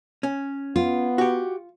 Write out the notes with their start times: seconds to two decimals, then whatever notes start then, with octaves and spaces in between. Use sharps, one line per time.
0.23 C#4
0.76 B3 F4
1.18 F#4 G4